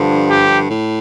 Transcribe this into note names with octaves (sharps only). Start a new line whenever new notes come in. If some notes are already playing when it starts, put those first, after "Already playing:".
Already playing: G2 D3 F3
G4
A2